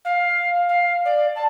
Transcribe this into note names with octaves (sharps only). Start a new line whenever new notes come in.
F5
F5
D5
A5